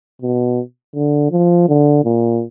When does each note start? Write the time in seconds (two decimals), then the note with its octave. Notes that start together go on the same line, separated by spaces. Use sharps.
0.22 B2
0.96 D3
1.31 F3
1.69 D3
2.05 A#2